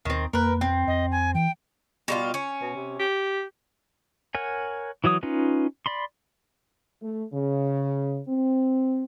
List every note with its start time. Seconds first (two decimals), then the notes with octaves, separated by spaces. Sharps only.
0.05 D#2 D#3 C4
0.33 F2 A#3 A#4 B4
0.61 C4 G5
0.87 F2 D#5
1.11 G#5
1.35 E3 G5
2.08 B2 G3 F4
2.34 C#4
2.61 B2
2.75 C3
2.99 G4
4.35 A#4 C#5 F#5 G#5
5.04 E3 F#3 C#5 D#6
5.23 C#4 D#4 F4 B4
5.86 D5 B5 C6
7.02 A3
7.33 C#3
8.28 C4